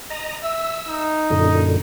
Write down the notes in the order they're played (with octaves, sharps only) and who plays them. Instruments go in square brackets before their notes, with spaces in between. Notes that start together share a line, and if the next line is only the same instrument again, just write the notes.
[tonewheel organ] D#5 A#5
[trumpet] E5 [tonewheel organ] E6
[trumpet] D#4
[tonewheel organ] F#2 A#2 D3